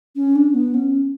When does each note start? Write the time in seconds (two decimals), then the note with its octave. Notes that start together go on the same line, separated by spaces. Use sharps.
0.15 C#4
0.35 D4
0.54 B3
0.74 C#4